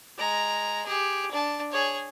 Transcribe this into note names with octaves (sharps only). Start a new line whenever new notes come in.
G#3 A#5
G4 G#4
D4 A5
G#4 C#5